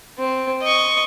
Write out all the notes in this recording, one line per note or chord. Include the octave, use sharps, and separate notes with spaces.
C4
D#5 C#6